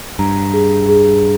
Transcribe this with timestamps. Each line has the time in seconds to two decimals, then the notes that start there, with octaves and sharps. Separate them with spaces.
0.19 G2 A#5
0.54 G#4
0.89 G#4